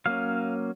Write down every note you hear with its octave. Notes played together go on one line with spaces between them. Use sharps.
F#3 A#3 C#4 F5